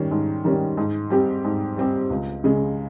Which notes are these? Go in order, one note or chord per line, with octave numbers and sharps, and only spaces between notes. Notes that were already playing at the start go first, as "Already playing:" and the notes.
Already playing: D#3 G3 C#4
G#2
D#3 G3 C#4
G#2
G3 C4 G4
G#2
G3 C4 G4
C#2
C#3 G#3